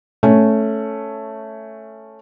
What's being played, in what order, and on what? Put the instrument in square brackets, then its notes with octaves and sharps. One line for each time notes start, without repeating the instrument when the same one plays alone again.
[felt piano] A3 C#4